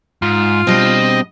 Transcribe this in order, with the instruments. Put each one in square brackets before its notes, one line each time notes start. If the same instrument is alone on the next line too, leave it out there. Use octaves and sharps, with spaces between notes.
[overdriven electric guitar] G#2 [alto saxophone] F4
[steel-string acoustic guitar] B2 G3 D4 [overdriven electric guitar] C4 [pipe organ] D#5